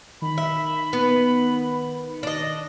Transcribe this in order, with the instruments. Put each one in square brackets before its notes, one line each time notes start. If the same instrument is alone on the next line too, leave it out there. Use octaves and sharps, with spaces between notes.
[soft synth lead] D#3 [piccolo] B5
[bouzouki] E5
B3
D4 D#5